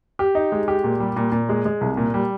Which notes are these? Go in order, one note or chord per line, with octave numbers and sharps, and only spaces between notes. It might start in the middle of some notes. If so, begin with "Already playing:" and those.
G4
D#4
G#3
G4
A#2
G3
A#2
A#2
G#3
G#3
C2
A#2
G3